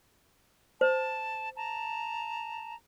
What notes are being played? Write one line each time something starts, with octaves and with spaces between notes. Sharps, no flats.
C5 A5
A5 A#5